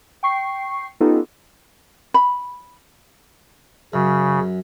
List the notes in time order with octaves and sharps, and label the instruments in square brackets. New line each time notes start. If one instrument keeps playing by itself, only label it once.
[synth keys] G5 C#6 C7
B3 C#4 D#4 F4 G4 A4
[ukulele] B5
[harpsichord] F#2 [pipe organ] C#3